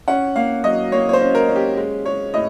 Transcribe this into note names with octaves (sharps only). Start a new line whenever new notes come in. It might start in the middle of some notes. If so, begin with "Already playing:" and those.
C#4 F#5
A#3 F5
F#3 D#5
A#3 C#5
C#5
C5
C#4
A#4
C#4
G4
G#3
G#3 C#5
A2 D#5